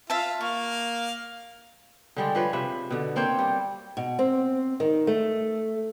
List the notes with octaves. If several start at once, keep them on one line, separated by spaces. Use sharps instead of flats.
F4 E5 A5
A#3 F5 C#6
D3 G3 G#3
F3 B4 C#5
C3 B4 E5
B2 D3
A#3 C4 C#5 G5
G3
B2
C4
D#3
A3